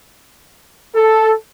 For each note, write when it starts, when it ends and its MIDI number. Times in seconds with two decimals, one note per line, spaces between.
0.95 1.32 69